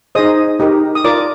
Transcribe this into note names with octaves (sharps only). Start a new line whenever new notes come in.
D#4 G#4 C5 D#5 D#6
D#4 G4 A#4
D#6
F4 A#4 D5 D6